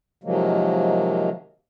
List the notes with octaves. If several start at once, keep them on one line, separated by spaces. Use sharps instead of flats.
C3 D#3 F3 F#3 G#3 A#3